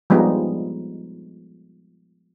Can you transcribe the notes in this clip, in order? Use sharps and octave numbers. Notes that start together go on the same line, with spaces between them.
F3 G3 G#3 B3 D#4